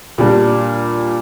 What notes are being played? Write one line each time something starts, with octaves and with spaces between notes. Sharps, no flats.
A#2 G3 D4